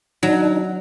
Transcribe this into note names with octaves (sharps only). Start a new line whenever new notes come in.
F#3 D4 D#4